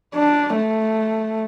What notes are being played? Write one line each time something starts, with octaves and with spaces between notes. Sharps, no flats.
D4
A3